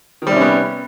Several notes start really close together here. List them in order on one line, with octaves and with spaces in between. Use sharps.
D#3 G3 C3 C#4 B3